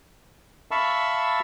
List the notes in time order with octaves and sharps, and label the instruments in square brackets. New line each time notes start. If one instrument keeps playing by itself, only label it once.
[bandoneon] E5 F5 A5 B5 C#6 E6